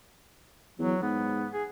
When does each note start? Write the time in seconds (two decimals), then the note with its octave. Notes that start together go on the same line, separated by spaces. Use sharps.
0.79 E2 F#3
1.02 G#2 B3
1.53 G#4